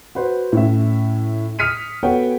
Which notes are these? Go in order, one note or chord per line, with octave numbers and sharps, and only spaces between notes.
F#4 B4 C5
A2 C#4 E5
D#6 F6 B6 C#7 D#7
B3 F#4 A4 C#5 F#5 G5